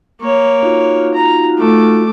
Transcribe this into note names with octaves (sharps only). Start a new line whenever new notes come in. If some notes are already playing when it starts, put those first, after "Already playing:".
A#3 C#5
D#4 F4 F#4
A#5
A3 D6